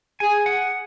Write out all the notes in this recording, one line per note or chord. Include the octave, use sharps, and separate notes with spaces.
G#4 G#5
F#5